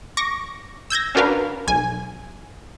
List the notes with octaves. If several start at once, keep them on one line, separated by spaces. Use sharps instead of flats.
C#6 D6 A#6
E6 G6 G#6 A#6
C#4 D4 F#4 A#4 B4 F5
B1 G#5